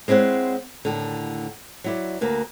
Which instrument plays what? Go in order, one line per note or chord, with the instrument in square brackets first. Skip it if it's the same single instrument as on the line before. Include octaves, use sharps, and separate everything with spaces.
[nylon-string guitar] G#3 C4 E4 C#5 F#5
D#2 A2 D3
F#3 E4 D5
D2 A#3 B4